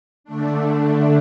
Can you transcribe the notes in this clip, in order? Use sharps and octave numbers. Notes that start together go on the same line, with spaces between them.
D3 A3 D4